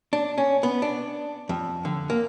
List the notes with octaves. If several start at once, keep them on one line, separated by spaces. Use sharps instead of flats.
D4
C#4
B3
D4
F2
D3
A#3